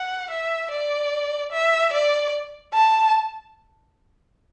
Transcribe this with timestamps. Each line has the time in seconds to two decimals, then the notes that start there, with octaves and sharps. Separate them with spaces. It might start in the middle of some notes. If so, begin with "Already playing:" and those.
Already playing: F#5
0.30 E5
0.71 D5
1.52 E5
1.93 D5
2.74 A5